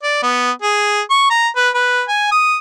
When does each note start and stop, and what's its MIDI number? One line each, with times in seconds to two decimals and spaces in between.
0.04 0.19 74
0.23 0.51 59
0.62 1.01 68
1.11 1.28 85
1.30 1.48 82
1.57 1.70 71
1.75 2.03 71
2.09 2.31 80
2.32 2.57 87